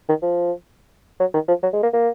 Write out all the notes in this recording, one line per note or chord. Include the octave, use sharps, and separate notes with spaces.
D#3
F3
F#3
D#3
F3
F#3
G#3
A#3
A#3